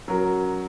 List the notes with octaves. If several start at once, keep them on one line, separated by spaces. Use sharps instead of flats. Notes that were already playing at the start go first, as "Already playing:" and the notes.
F#3 C#4 F#4 A#4